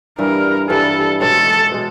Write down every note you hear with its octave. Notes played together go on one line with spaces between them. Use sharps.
G2 E3 G3 A#4
G2 E3 G3 A4
B2 G#3 C#4 A4
B2 G#3